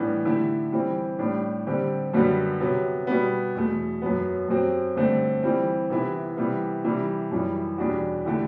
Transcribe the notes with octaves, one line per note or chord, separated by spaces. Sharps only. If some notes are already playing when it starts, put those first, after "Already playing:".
Already playing: A2 E3 G3 B3 D4
D3 A3 E4 G4
E3 G3 C4
A2 G3 D4
D3 G3 C4 G4
F#2 D3 G3 B3 F#4
C3 F#3 B3
B2 G3 B3
E2 B2 A3
F#2 F#3 B3
F#2 F#3 C4 G4
G2 D3 A3 C4
E3 G3 C4
C3 E3 B3 E4
C3 E3 G3 B3
C3 E3 G3
F#2 E3 G3
E2 B2 G3 D4 F#4
D3 A3 E4 G4